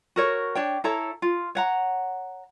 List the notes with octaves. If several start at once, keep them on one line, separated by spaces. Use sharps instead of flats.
F#4 A#4 C#5
D4 C#5 G5
E4 A4 C#5 A#5
F4
C#5 F#5 A#5